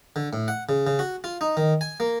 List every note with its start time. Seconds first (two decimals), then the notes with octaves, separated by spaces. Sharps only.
0.16 D3
0.33 A2
0.48 F#5
0.69 C#3
0.87 C#3
0.99 F#4
1.24 F4
1.41 D#4
1.57 D#3
1.81 G#5
2.00 A#3